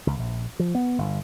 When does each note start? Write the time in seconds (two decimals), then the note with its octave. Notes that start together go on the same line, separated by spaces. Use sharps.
0.07 C#2
0.19 A#1
0.59 F3
0.75 B3
0.98 G1